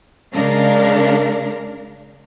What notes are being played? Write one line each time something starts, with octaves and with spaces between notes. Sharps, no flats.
C#3 G#3 D4 A#4 F5